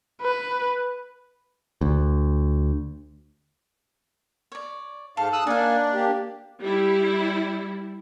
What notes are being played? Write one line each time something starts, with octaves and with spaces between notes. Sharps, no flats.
B4
D2
C#5 D5
G#2 A4 F5
D#6 E6 F#6
A#3 D4 D#4 F5 G#5
A#3 G4
G3 E4